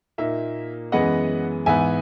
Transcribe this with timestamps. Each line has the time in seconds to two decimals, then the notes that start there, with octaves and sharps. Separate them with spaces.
0.18 A#2 A#3 D#4 E5
0.92 F#2 E3 G#3 B3 D#5 F#5
1.66 G#2 E3 B3 E5 G#5